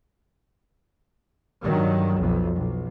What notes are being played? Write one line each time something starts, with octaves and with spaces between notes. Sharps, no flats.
G2 D#3 F#3
B1 F2
B1